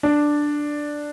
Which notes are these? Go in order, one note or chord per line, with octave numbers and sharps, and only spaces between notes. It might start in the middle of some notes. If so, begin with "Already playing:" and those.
D4